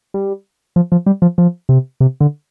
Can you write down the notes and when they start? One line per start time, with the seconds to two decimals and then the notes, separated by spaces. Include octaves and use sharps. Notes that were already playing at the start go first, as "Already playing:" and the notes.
0.14 G3
0.76 F3
0.92 F3
1.06 G3
1.22 F3
1.38 F3
1.69 C3
2.00 C3
2.21 D3